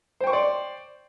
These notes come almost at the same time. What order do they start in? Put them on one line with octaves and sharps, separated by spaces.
C5 G5 C#6 C6 D5